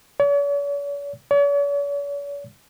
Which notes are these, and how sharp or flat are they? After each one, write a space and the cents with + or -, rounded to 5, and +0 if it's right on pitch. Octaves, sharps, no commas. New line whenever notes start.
C#5 +45
C#5 +45